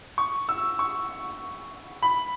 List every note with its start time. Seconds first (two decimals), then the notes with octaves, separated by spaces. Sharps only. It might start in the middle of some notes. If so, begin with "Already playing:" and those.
0.18 C#6
0.49 E6
0.79 C#6
2.03 B5